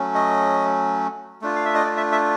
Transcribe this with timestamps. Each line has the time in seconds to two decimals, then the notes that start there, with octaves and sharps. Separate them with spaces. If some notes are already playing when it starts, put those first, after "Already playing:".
Already playing: F#3 A3 C#4
0.15 D#5
1.42 A3 D4 F4
1.56 F5
1.65 E5
1.75 D#5
1.84 D5
1.97 E5
2.12 E5